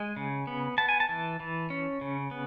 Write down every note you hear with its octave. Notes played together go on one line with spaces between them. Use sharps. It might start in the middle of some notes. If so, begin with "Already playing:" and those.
Already playing: G#3 G#5
C#3
B3
B3 A5
G#5
A5
E3
E3
C#4
C#3
B3